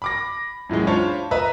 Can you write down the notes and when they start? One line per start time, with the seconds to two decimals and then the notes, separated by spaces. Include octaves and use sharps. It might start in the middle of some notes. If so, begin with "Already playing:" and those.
0.02 B5 D6 A#6
0.69 F#2 A2 E3 G#3
0.87 D4 F4 C5 C#5 A5 B5
1.31 B4 D#5 E5 A#5 B5